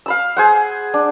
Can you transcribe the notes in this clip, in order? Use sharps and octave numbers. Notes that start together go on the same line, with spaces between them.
F5 B5 E6
G#4 C5 F#5
D4